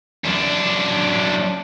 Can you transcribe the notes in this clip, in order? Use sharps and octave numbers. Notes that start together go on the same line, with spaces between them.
F#2 D4